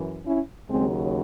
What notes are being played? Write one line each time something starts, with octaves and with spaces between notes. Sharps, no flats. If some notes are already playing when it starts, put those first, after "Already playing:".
Already playing: F#2 E3
C#4 E4
D#2 C#3 F#3 G#3 C4